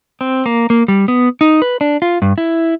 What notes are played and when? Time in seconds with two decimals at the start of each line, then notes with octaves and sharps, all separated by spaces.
0.21 C4
0.46 A#3
0.70 A#3
0.88 G3
1.08 B3
1.41 D#4
1.62 B4
1.81 D4
2.02 F4
2.22 G2
2.38 E4